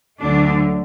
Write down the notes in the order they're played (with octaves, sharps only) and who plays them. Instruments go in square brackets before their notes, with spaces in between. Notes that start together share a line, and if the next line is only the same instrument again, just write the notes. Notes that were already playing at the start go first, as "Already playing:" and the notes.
[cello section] D2 D3 F#3 A3 D4